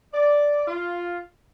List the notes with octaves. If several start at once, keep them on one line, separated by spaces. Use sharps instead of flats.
D5
F4